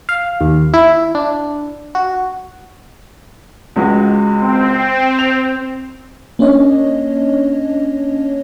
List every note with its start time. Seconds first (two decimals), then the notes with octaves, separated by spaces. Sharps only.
0.09 F5
0.41 D#2
0.74 E4
1.15 D4
1.95 F#4
3.76 C#2 G#3 F#4
4.39 C4
5.19 F7
6.39 A#3 C#4 D4 C#5 D#5